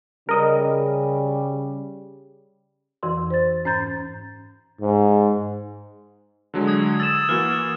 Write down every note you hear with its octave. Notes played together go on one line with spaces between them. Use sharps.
C#3 G3 A#4 D#5
F2 E3 F#4 C6
C5 A6
G#2 C#4 A#5 G6 A6
G#2
D3 F#3 G#3
D#6 G#6
D#6 E6 A6 E7
E3 A#3 F#4 F6